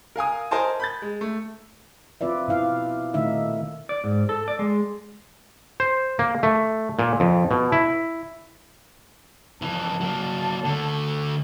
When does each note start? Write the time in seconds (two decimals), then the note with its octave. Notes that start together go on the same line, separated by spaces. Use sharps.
0.16 A#4 F5 G#5 D#6
0.51 A#4 C5 D#5 G#5 A5 C6
0.80 B5 G6 A6
1.02 G#3
1.21 A3
2.21 C4 F4 B4 D5 E5
2.48 B2 E4 F5
3.14 A#2 D#3 A3 D#4 E5
3.89 D5
4.04 G#2
4.29 A4
4.48 D5
4.59 G#3
5.80 C5
6.19 A#3
6.43 A3
6.99 A#2
7.20 F2
7.51 B2
7.72 E4
9.62 F2 E3 A5
10.01 F#3 A#3
10.65 D3 A3